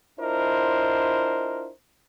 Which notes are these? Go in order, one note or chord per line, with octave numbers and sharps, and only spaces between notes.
D4 E4 F4 A#4 C5 D#5